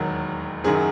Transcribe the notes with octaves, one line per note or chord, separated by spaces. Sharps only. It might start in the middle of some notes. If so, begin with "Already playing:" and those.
Already playing: E1 D#2 D#3 F#3
F#1 F#2 D#3 F#3 G#4